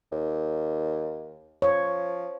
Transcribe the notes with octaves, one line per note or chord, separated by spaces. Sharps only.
D#2
F3 C#5